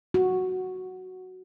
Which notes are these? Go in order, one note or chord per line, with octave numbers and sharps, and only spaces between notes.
F#4